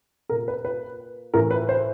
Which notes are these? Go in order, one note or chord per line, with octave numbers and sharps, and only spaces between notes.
A#2 A#4
B4
B4
A2 E3 A#4
B4
C5